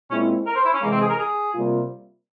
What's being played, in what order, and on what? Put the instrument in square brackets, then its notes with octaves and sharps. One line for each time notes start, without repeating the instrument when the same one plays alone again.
[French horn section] A#2 G#3 C4 E4 [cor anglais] C#4
[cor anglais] A#4
C5
E4
C#4
[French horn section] C3 E3 G#3 [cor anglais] A#3
[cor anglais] C4
G#4
A#4
G#4
[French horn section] C3 G3 A#3 F4